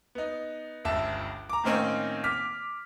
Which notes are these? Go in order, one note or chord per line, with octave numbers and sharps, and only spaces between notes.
B3 D#4
G1 C#2 E5 A5
A#5 D6
A2 D#3 A#3 C4 C#4 D#4
D6 F6 B6